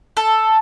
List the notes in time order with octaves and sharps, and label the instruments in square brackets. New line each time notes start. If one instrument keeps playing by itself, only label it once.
[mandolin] A4